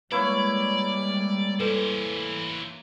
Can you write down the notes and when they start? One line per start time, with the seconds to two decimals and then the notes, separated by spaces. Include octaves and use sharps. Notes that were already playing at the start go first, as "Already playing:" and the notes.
0.12 G3 G#3 A#3 E4 B4 C#5 D5
1.60 E3 A4 B4 C5